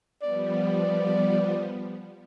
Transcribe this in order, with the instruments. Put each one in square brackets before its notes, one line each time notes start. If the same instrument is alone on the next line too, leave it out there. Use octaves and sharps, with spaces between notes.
[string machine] F3 G3 B3 [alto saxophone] D5